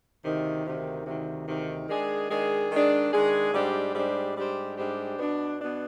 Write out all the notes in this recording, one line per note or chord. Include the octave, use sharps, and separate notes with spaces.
D2 C3 D#3
D2 C3 D#3
D2 C3 D#3
D2 C3 D#3
D#3 G#3 D4 G#4
D#3 G#3 D4 G#4
D#3 G#3 D4 G#4
D#3 G#3 D4 G#4
G#2 G3 D4 G4 C5
G#2 G3 D4 G4 C5
G#2 G3 D4 G4 C5
G#2 G3 D4 G4 C5
B2 B3 D4
B2 B3 D4